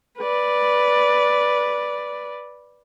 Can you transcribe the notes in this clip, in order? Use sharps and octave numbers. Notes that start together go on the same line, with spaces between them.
B4 D5